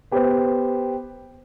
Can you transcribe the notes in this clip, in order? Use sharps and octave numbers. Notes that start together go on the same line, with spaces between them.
B3 G4 B4 C5